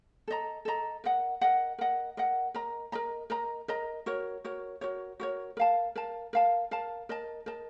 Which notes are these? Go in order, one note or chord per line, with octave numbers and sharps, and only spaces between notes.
A4 D#5 A#5
A4 D#5 A#5
A#4 D#5 F#5
A#4 D#5 F#5
A#4 D#5 F#5
A#4 D#5 F#5
A#4 D#5 A#5
A#4 D#5 A#5
A#4 D#5 A#5
A#4 D#5 A#5
F#4 A#4 C#5
F#4 A#4 C#5
F#4 A#4 C#5
F#4 A#4 C#5
A#4 F5 A5
A#4 F5 A5
A#4 F5 A5
A#4 F5 A5
A#4 D#5 A5
A#4 D#5 A5